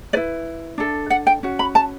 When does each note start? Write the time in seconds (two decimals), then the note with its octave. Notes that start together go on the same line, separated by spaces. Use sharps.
0.13 E4 B4 D5
0.78 D4 A4
1.10 F#5
1.27 G5
1.43 C#4 F#4
1.59 B5
1.75 A5